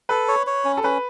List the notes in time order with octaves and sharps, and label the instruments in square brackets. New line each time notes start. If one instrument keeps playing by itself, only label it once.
[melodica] A4 [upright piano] B4
[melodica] C#5
C#5
C#4
[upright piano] A4
[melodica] C#4 [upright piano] B4